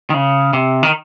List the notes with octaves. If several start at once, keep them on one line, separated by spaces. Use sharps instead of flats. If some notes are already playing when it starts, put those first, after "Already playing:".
D#3
C#3
C3
D#3